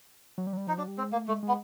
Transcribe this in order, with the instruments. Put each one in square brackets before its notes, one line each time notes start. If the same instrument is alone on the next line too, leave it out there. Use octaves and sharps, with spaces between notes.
[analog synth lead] F#3
G3
F#3
G3
[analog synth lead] F3 [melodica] D#4
[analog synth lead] F#3 [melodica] D4
[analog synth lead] G3
[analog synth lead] G#3 [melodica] C4
[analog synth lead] A3 [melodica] A#3
[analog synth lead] G#3 [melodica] A3
[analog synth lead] G#3
[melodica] B3